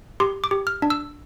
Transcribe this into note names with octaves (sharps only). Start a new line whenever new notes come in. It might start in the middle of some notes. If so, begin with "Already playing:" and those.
G4 C6
D6
G4
F6
D4
E6